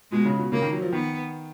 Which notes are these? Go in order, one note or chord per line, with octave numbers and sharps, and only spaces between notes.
B2 G#3
C#3
B2
C#3 A#3
D#3
F#3
F3
D#3 B3